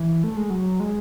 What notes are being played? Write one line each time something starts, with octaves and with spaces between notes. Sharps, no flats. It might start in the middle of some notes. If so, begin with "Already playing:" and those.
Already playing: E3
A3
G#3
F#3
G#3